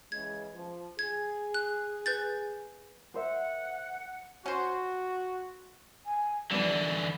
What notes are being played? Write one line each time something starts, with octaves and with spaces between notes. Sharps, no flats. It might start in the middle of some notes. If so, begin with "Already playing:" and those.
C#3 E3 G#3 G#6
F3
G#4 G#6
F#6
B4 G6 A6
A#4 C5 E5 F#5
C#4 F#4 C5
G#5
D3 E3 F3 G3 B3 D5